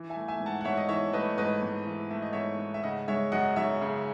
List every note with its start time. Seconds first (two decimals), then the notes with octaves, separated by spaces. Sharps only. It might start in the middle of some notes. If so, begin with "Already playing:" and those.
Already playing: E3
0.10 E5 G#5
0.16 A3
0.28 E5 G#5
0.40 G#2
0.46 F#5 A5
0.61 F#5
0.65 G#2 C#5 E5
0.77 D#5
0.89 E3 C#5 E5
1.13 A3 B4 D#5
1.37 G#2 B4 D#5
1.63 G#2
1.87 E3
2.11 A3 E5
2.22 D#5
2.33 G#2 C#5 E5
2.59 G#2
2.74 E5
2.83 C#3 D#5 F#5
3.08 G#3 C#5 E5
3.32 F#2 D#5 F#5
3.56 F#2 C#5 E5
3.81 C#3